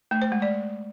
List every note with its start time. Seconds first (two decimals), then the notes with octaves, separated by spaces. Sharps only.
0.11 A3
0.22 C5
0.32 G#3
0.42 D5